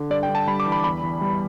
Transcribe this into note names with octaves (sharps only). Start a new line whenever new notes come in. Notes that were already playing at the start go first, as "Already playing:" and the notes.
Already playing: D3
G2 D5
G5
G2
A5
G3 B5
D6
E3
B5
E2 B5
E2
G3